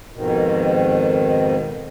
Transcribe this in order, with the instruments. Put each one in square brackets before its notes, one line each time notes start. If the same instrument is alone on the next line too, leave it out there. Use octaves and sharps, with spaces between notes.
[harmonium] F2 G#2 B2 D#3